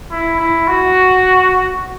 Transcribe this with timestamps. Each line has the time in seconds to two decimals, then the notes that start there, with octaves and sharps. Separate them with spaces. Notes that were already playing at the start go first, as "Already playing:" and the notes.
0.11 E4
0.39 E4
0.68 F#4